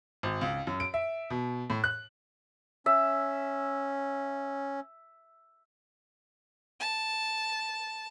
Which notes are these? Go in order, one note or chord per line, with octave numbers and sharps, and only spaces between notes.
G#1
C#2
F#2
D7
E5
B2
A2
F#6
C#4 E5
A5